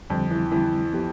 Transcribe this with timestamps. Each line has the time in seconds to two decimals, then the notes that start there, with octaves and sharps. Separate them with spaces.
0.10 F2 D3 G3 C4
0.31 E3
0.52 D3 E3 G3 C4
0.93 F3 B3 E4 G4